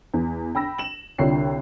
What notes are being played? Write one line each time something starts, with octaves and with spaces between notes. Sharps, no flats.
E2
G5 B5 E6 A#6
E7 F#7
C2 D3 F4 C#5 G5 C7